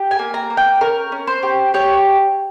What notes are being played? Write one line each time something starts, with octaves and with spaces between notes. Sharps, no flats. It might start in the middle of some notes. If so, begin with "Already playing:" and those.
Already playing: G4
G#5
A#3
A#5
A#3
G5
C#4 A#4
C#4
C5
G4
G4 C#5